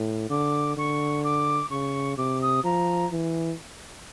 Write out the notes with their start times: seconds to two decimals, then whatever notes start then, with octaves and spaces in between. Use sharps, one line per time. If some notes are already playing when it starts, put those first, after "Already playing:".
Already playing: A2
0.30 D3 D6
0.77 D3 C#6
1.24 D6
1.70 C#3 C#6
2.17 C3 D6
2.41 D#6
2.64 F3 A#5
3.11 E3